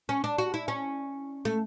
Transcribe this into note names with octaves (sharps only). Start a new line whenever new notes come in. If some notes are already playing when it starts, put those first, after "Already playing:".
C#4
D4
F#4
E4
C#4
A3